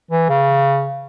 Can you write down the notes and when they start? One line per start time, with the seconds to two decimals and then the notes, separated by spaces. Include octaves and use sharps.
0.11 E3
0.29 C#3